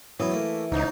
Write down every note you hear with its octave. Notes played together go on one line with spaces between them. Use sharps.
E3 F#3 B3
A3 A#3
C#2 G#2 C#3 D#4